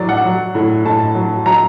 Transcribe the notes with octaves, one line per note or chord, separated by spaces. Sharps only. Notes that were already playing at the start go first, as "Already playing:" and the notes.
Already playing: A2 F#3 D5
F#5
F#3
A2
A2 A5
F#3
F#3 A#5